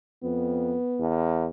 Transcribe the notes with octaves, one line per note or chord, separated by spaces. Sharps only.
F2 B3
E2